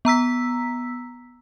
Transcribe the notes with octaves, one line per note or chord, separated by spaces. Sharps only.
B3 A#5 E6 B6